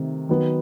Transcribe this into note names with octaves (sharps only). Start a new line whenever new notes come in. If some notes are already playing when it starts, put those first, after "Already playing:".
Already playing: C3 D#3 A3
D#3 F#3 B3